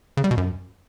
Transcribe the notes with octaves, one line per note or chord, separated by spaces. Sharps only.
C#3
G3
B2
F#2